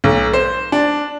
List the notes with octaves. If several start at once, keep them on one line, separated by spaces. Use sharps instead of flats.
B1
C5
D4